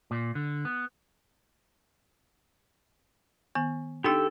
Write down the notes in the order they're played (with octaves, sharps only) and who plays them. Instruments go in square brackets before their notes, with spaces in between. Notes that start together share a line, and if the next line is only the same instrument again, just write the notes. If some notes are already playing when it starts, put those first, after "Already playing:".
[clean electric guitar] A#2
D3
B3
[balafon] D#3 B3 G#5
[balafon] D4 D#4 G5 [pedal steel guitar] G4 A4 E6